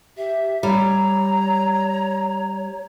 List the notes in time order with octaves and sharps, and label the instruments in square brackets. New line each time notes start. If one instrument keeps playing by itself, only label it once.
[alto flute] G4 [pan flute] E5
[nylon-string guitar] G3 [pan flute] C#5 [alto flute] A#5